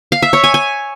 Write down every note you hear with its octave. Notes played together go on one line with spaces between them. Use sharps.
F5
E5
C#5
G#5
G#5